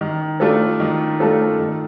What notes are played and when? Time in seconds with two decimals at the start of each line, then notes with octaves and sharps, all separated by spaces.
0.01 D#3
0.40 A3 D4 F4 A4
0.80 D#3
1.20 A3 D4 F4 A4
1.60 D#3